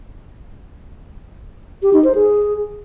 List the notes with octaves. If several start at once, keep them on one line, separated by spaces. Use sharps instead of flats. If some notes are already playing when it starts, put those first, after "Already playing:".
G4
D#4
C5
G#4